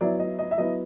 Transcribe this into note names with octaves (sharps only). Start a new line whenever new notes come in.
F#3 B3 E4 D5
D#5
D#5
E5
F#3 B3 E4 D#5